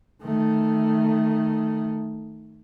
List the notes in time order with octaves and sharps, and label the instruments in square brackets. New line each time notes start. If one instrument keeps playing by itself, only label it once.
[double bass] D#3 A3